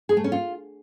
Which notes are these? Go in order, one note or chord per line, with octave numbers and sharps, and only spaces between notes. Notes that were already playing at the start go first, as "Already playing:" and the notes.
G#4
A3
C#4
F4